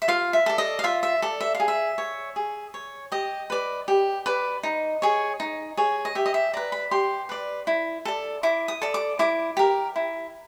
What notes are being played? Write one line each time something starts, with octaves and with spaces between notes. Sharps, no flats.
E5
F4 F5
E5
A4 D5
D#5
F5
F4 E5
E5
A4 D5
E5
F5
G#4
E5
C#5
G#4
C#5
G4 D#5
B4 D5
G4
B4 D5
D#4
G#4 C#5
D#4
G#4 C#5
D#5
G4 E5
D#5
E5
B4 D5 A#5
B5
G4 C6
B4 D5
E4
A4 D5
E4 D6
D#6
A4 D5
D6
E4 D6
G4 A#4
E4